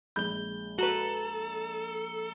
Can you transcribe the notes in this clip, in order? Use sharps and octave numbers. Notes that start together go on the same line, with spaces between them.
A#1 G#3 B5 G6 G7
F#4 A4 B4 A#5 F#7